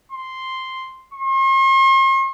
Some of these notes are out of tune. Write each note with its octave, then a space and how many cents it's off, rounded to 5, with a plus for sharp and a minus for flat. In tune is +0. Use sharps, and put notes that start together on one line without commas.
C6 +0
C6 +45